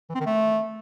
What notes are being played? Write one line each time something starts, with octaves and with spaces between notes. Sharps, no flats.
E3
C4
D#3
A3